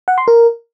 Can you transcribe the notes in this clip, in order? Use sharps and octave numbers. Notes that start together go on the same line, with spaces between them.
F#5
C6
A#4